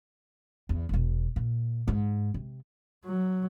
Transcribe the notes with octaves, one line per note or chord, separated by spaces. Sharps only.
E2
E1 B2
A#2
G#2
C3
F#3